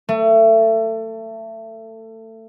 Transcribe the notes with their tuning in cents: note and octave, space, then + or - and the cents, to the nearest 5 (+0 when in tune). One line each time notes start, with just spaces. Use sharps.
A3 +25